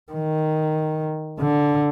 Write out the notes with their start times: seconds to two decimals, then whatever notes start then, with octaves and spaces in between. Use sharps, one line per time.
0.12 D#3
1.40 D3